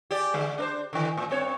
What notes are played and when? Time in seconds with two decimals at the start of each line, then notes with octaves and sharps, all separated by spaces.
0.11 G4 G#4 D5
0.34 D3 G#3
0.58 D4 A#4 C5
0.93 D3 D#3
1.17 A2
1.30 G2 C4 C#5